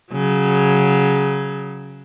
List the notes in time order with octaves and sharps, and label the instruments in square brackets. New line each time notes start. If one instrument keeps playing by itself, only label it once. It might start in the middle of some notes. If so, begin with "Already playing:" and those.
[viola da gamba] C#3 F#3